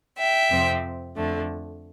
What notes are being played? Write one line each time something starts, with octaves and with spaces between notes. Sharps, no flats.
E5 G5
F2 C3 F3 C4
F2 D3 A3